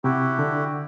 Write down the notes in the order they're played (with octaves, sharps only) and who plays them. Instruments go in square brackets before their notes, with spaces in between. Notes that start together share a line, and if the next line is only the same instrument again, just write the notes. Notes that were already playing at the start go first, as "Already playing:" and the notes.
[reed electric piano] C3 [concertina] E4 F#4 G4
[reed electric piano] D3